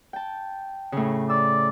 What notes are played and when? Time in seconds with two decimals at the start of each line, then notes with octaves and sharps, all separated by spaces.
0.13 G5 A5
0.92 A2 C#3
1.30 D5 E6